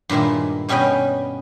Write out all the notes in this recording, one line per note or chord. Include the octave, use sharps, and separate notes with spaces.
G2 A#2 D#3 G#3 E4
B2 G3 C#4 B4 D#5 G5